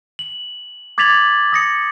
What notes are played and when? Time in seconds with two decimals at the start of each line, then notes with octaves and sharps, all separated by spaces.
0.19 F#7
0.98 D6 G#6 A6 B6 F7 F#7
1.53 D#6 A#6 C#7